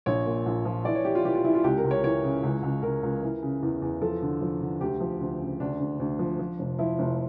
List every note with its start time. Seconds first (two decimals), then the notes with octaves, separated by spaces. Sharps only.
0.06 A#1 C#5
0.26 A#2
0.46 A#1
0.65 F3
0.85 E3 D5
0.95 C#5
1.05 E3 G4
1.15 F4
1.25 E3 G4
1.35 F4
1.44 E3 E4
1.55 F4
1.64 C#2 G4
1.78 A#4
1.84 C#2
1.91 C#5
2.04 E3 C#5
2.23 C#3
2.43 C#2
2.63 C#2
2.82 C#2 A#4
3.03 C#2
3.22 E3
3.42 C#3
3.63 E2
3.82 E2
4.02 F3 A4
4.22 D3
4.41 F3
4.61 D3
4.81 D2 G4
5.00 F3
5.20 D2
5.40 C#3
5.60 D2 D4
5.80 D2
6.00 D2
6.19 F3
6.39 F3
6.59 F1
6.78 F3 E4
6.99 F1